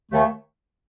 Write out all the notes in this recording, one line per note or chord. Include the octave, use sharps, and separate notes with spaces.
D#2 D#3 A3